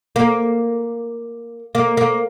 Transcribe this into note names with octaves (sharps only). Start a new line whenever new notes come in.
A#3
A#3
A#3